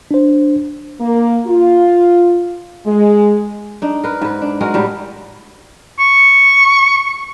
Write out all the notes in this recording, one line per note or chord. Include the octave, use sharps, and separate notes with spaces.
D4 C5
A#3
F4
G#3
D4 D#4
A#4 B4
G#2 B4
D4
G#3 F#4 G#4 A#4
A2 G3 D#4
C#6